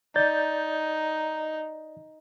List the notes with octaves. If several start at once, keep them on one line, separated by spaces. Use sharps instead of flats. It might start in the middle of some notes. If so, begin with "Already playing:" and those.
D#4 D5 G6 A6